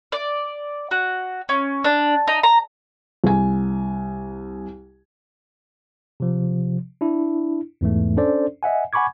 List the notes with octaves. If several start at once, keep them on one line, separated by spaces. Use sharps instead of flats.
D5
F#4
C#4
D4
D#4
A#5
C2 G#5
C3 F3
D4 E4
E2 G#2 E3 A3
C#4 D4 A4 C5 D5
D#5 E5 F#5 G#5
F#5 G#5 B5 C#6 D6 G#6